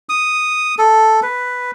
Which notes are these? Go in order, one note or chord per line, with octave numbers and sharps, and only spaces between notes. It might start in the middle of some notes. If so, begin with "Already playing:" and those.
D#6
A4
B4